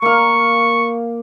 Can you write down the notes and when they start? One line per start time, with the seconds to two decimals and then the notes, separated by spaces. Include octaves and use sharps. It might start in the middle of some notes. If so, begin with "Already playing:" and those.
0.02 A#3 F5 C#6